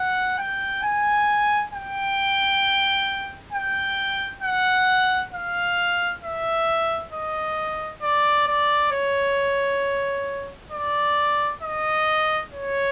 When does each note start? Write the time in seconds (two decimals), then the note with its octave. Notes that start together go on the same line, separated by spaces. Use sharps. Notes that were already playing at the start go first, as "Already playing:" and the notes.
Already playing: F#5
0.38 G5
0.83 G#5
1.73 G5
3.53 G5
4.43 F#5
5.33 F5
6.23 E5
7.13 D#5
8.03 D5
8.47 D5
8.92 C#5
10.72 D5
11.62 D#5
12.53 C#5